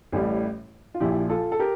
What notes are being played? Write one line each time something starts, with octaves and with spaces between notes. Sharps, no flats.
A1 A2 G3
F4
A#1 A#2 F3 E4 G4
F4 A4
A4
G4 A#4